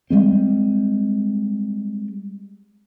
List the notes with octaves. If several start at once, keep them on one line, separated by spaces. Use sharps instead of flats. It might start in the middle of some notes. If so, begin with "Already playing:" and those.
G3 G#3 C4